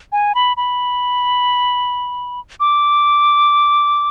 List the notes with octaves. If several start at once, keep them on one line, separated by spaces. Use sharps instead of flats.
G#5
B5
B5
D6